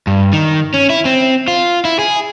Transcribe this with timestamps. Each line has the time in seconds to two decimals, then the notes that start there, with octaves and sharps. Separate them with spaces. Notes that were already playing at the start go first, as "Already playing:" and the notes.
0.07 G2
0.33 D#3
0.74 C#4
0.90 E4
1.05 C4
1.48 F4
1.85 E4
1.99 G#4